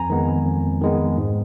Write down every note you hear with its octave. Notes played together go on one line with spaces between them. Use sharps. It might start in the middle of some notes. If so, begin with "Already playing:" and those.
Already playing: F2 G#5 A#5
D#3 G#3 B3
F2
D#3 G#3 B3
G#2